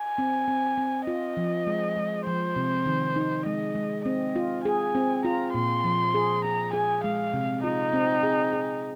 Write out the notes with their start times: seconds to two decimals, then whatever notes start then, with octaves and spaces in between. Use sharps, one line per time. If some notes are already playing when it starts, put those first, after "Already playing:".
Already playing: G#5
0.18 C4
0.48 C4
0.77 C4
1.07 F4 D#5
1.37 F3
1.67 G#3
1.97 G#3
2.26 F3 C5
2.56 C3
2.86 D#3
3.16 D#4
3.46 G#3 D#5
3.75 G#3
4.05 C4 D#5
4.36 F4
4.65 G#4 G#5
4.95 C4
5.25 F4 A#5
5.54 A#2 C6
5.84 F3
6.14 G#4
6.45 G#4 A#5
6.73 G#4 G#5
7.04 G#3 F5
7.34 C3
7.63 D#4 F4
7.93 C4
8.23 G#4
8.53 G#4